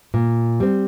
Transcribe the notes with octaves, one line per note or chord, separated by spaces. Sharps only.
A#2
G3 C4